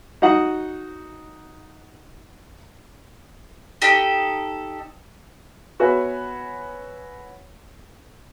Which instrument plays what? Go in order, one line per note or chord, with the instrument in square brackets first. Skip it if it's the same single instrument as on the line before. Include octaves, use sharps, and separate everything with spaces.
[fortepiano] D#4 F#4 F#5 D#6
[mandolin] D#4 G4 A4
[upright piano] B3 F#4 B4 C#5 E5 G#5